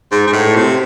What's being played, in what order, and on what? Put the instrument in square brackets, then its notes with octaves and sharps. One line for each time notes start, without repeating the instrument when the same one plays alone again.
[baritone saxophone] G#2
G#2
A2
C3